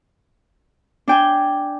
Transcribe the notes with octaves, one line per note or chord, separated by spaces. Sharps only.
D4 G5 G#5